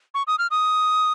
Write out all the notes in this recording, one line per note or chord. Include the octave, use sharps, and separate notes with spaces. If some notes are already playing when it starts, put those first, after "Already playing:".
C#6
D#6
F6
D#6